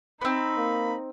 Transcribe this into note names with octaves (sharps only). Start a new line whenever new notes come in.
B3 C4 D#4 B5
A#3